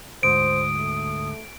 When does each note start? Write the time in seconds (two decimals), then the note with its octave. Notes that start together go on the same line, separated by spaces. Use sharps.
0.23 D2 G#2 C5 D#6 D7
0.77 A3